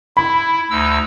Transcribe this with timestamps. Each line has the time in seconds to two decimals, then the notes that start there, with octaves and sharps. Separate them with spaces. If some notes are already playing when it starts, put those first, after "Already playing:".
0.17 E4 B5
0.70 D2 D#4 E6